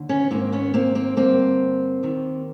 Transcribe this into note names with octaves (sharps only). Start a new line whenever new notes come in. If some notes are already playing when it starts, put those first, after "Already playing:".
Already playing: D#2 D3
B3 C#4
G#2 D#3 A#3 C4
B3 C#4
A#3 C4
A#3 C4
G2 D3 A#3 C4
D#2 D#3